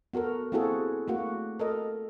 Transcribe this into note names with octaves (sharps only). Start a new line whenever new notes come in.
B3 F#4 A4 A#4
A#3 C4 E4 F#4 G#4 A4
A3 A#3 F#4
A4 A#4 D#5